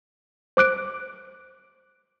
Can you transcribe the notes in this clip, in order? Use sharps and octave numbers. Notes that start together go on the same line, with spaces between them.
C5 D6 F#6 D7